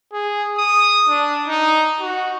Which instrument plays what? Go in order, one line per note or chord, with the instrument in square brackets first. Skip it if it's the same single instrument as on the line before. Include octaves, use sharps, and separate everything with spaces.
[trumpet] G#4
D#6
D4
D#4
F#4